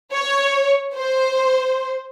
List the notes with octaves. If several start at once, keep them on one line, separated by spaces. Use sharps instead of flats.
C#5
C5